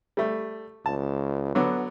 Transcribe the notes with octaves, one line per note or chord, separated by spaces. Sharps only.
G3 A3
C#2 A5
D3 F#3 B3